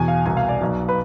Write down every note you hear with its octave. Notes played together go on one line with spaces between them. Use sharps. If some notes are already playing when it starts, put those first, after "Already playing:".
Already playing: E2 B2 G#5
F5
C2 B2 G#5
F5
D5
B1 B2
B4